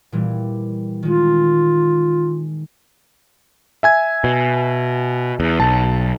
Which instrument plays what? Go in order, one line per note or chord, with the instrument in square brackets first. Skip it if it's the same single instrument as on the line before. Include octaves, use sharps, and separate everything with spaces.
[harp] A#2 E3 G3
[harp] D#3 G#3 [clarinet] F4
[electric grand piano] E5 G#5 G#6
[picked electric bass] B2
E2
[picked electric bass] B1 [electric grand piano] A5